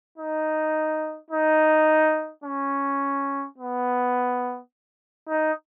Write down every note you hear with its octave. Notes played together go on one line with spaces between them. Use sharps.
D#4
D#4
C#4
B3
D#4